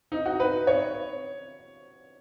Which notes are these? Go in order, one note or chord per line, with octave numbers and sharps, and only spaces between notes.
D#4
F#4
B4
C#5